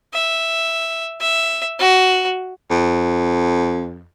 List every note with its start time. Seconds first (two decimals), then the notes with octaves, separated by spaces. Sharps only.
0.13 E5
1.21 E5
1.79 F#4
2.70 F2